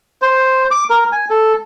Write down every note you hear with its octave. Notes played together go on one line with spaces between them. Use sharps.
C5
D6
A#4
G#5
A4